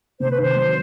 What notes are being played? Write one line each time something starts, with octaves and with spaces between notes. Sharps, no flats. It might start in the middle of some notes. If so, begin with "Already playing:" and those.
C3 C5
B4
D#3 C5
F#3